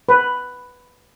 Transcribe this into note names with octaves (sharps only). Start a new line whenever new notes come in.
B4